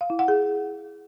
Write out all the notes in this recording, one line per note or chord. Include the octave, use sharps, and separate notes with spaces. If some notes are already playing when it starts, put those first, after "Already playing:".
F5
E4
F#5
G#4